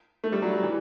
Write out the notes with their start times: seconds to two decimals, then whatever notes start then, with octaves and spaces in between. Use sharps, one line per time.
0.24 A3
0.32 G3
0.42 F#3
0.53 F#3
0.63 E3